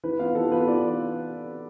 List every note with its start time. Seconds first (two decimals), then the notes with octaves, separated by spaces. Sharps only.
0.03 E3 B4
0.19 B3 F4 F5
0.35 E3 A4
0.51 B3 F4 B4
0.67 E3 D5